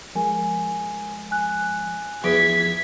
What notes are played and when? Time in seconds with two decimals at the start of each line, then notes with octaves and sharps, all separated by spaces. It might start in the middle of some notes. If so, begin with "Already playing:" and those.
0.15 F3 G#3 A#4 G#5
1.31 G#5 F#6
2.24 E2 F3 G#6 B6 D7